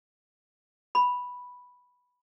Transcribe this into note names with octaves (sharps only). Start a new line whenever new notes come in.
B5